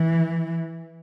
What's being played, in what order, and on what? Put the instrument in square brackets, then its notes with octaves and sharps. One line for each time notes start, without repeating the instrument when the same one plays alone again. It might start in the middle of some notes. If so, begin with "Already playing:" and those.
Already playing: [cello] E3